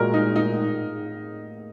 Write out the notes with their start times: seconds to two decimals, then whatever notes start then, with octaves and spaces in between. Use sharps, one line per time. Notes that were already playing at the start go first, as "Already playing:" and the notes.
Already playing: A#2 G#3 F#4 A#4
0.14 D#4
0.36 D#4